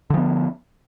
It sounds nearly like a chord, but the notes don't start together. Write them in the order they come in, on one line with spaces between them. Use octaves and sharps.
D3 F3 B3